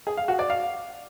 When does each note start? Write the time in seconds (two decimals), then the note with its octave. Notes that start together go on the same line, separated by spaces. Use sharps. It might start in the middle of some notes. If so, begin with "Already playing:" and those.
0.07 G#4
0.17 F5
0.28 F#4
0.39 D5
0.50 F5